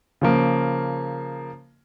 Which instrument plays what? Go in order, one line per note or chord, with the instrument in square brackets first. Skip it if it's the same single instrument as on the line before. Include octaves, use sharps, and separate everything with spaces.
[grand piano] C#3 F3 A#3